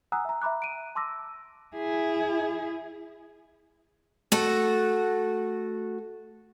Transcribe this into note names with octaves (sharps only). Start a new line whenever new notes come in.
F#5 G#5 A#5 D#6 E6 F#6
E5 A#5
E5 A#5 B5 D6 F#6
D7 D#7
A5 C6 D6 E6 A#6
E4 G#4
A3 F#4 A4